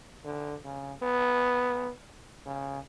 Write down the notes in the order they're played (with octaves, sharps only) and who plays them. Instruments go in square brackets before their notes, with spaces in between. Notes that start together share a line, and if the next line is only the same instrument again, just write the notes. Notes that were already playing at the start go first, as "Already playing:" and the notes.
[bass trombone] D3
C#3
B3
C#3